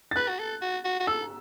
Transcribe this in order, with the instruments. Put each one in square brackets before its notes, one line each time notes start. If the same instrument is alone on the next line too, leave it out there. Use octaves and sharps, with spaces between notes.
[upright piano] A6
[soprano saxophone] B4 [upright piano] F#6
[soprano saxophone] F#4
A4
F#4
F#4
F#4
[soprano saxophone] A4 [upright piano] E6